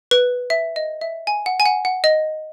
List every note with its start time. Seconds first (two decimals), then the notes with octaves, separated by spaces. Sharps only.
0.11 B4
0.50 E5
0.76 D#5
1.01 E5
1.27 G#5
1.46 F#5
1.60 G#5
1.65 F#5
1.85 F#5
2.04 D#5